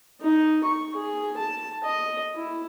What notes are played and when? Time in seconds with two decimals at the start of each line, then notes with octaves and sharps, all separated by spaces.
0.20 D#4
0.63 C#6
0.95 G#4
1.37 A5
1.84 D#5
2.35 E4